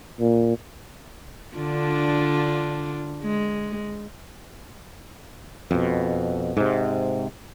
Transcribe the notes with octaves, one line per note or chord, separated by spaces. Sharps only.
A#2
D3 D4 F4
G#3
F2 B2
G#2 C3